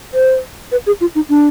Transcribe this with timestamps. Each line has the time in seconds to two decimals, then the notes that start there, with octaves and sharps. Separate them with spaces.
0.14 C5
0.72 B4
0.87 G#4
1.01 F4
1.15 D#4
1.30 D4